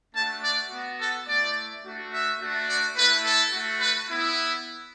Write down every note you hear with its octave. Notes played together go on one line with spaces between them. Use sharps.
A3 D4 F#4 A5
D5
B3 F#4
A4
A3 E4 D5
A3 D4 F#4
E5
A3 D4 F#4
D5
A3 E4 B4
A4
A3 F#4
B4
B3 E4